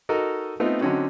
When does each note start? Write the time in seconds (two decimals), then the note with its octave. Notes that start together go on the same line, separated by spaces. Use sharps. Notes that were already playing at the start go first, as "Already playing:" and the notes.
0.09 D#4 F#4 A4 A#4 D#5
0.60 A3 B3 C4 D#4 F4 A4
0.81 D3 F#3 C4 C#4 D#4 F#4